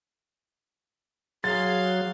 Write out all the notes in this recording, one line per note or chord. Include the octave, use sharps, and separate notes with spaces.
F#3 G#4 F5 C6 A6